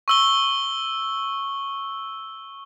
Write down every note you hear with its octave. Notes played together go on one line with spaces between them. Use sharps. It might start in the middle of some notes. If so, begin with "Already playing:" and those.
C#6 E6 G7